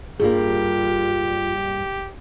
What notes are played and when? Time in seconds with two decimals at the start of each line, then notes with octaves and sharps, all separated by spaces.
0.20 G2 G3 A#3 F4 G4 G#4